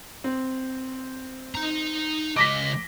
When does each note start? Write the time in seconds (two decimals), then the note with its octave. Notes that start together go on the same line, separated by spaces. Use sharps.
0.24 C4
1.55 D#4 A#5
2.36 C#2 D#5 D6 A#6 B6